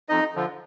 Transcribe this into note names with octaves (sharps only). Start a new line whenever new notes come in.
F2 D#4 D#5
D3 F3